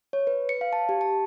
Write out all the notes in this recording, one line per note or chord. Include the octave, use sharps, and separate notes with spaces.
C#5
B4
C#7
F5
A5
G4
A5